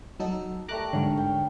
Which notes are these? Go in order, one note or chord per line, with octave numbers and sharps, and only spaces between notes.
F#3 D#4 A4
G3 A3 A#4 A#5 D6 F#6
G#2 D3 C#5 F5
G5